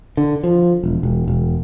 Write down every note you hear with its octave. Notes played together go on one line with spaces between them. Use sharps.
D3
F3
E1
E1
E1